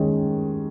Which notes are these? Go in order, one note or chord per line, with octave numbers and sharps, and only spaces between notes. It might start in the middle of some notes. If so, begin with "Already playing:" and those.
Already playing: D#2 D#3 G#3 C#4